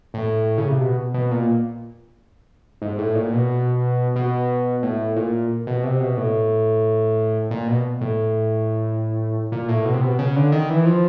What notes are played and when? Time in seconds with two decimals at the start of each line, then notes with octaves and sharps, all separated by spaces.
0.14 A2
0.58 C#3
0.69 C3
0.81 B2
1.14 B2
1.31 A#2
2.82 G#2
2.98 A2
3.15 A#2
3.33 B2
4.16 B2
4.83 A2
5.16 A#2
5.67 B2
5.83 C3
6.00 B2
6.17 A2
7.51 A#2
7.68 B2
8.01 A2
9.52 A#2
9.68 A2
9.85 B2
9.94 C3
10.02 B2
10.19 C#3
10.36 D3
10.52 D#3
10.70 E3
10.86 F3